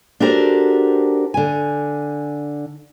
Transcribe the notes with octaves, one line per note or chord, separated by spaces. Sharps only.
D4 F#4 G4 A4 A#4 C5
D3 G#5